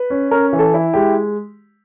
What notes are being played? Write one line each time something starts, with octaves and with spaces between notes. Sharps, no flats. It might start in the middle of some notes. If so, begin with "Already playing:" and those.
Already playing: B4
C#4
C#4 A#4
E3
A4
E4
G#3 G4